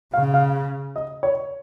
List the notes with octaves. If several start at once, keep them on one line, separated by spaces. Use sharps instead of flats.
C#3 F5
F5
D#5
C#5